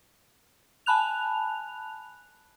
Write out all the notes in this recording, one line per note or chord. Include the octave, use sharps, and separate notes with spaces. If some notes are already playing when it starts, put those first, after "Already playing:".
G#5 A5 B5 F#6 F7